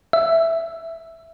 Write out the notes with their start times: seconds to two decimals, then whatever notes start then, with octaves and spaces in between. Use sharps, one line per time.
0.13 E5